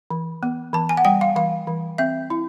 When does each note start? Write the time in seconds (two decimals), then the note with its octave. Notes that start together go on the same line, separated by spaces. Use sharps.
0.10 E3
0.43 B3
0.73 E3 A5
0.89 G#5
0.97 F#5
1.05 G3 G5
1.21 F5
1.36 E3 F5
1.67 E3
1.98 C4 E5
2.30 E4